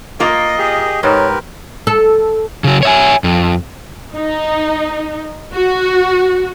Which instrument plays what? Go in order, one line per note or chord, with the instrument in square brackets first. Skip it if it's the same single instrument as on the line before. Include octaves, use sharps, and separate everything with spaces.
[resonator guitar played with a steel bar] A#3 F4 A#4 [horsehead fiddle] D#5
[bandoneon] G4 G#4
[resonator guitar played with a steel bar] G#2 [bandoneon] G4 A#4 B4 [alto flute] C#5
[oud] A4
[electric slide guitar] C#3 F#3
C#5 E5 G#5
F2
[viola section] D#4
F#4